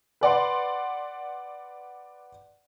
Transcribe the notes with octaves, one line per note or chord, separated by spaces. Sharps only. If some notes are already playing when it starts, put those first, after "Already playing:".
B4 D5 F#5 C6